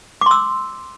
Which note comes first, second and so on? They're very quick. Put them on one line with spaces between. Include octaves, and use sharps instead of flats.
D6 C6 E6